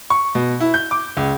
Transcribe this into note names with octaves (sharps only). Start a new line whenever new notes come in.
C#6
B2
E4
G6
D6
C#2